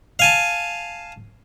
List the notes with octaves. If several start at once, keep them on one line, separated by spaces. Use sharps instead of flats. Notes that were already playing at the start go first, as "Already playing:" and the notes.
F5 G#5 A5